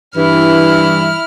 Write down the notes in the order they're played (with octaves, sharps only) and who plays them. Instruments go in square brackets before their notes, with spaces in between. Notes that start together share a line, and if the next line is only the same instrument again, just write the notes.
[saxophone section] G2 E3 [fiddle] E4 F6